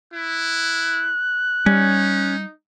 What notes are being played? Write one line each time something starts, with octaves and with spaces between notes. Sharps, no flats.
E4 F#6
G3 C#4 D#4